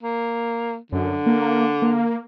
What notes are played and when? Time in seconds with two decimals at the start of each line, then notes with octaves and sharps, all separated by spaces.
0.03 A#3
0.92 F#2 D3
1.26 A#3
1.82 A#3